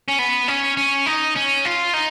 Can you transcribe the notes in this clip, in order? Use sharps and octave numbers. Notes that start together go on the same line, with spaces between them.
C#4
B3
C#4
C#4
D#4
C#4
F4
D#4